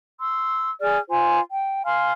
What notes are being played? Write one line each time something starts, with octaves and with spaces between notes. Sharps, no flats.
C6 E6
G#4 D5 F6
F4 C5 G#5 C6
G5
F5 G#5 C6 F6